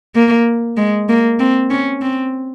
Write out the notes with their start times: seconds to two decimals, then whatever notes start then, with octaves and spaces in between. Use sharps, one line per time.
0.15 A#3
0.77 G#3
1.09 A#3
1.40 C4
1.70 C#4
2.01 C4